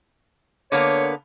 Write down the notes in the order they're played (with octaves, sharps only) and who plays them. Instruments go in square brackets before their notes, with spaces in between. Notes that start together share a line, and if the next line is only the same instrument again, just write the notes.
[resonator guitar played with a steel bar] D3 A#3 B3 [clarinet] C#5